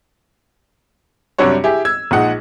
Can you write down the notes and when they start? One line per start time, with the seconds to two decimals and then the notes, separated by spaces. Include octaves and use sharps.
1.38 F#2 C3 G3 D4 F#4 C#5
1.64 E4 G4 G#4
1.85 E6 G#6
2.11 A#1 G#3 D#4 F#5